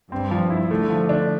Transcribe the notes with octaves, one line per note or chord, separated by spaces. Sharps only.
G2 C4
F3
E4
D3 A3
F3
D4